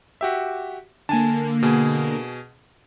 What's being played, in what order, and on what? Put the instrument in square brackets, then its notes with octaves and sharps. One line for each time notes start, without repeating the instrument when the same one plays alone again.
[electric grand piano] F#4 G4 E5
[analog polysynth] D3 A#3 [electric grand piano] G#5 A5
[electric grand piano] B2 G#4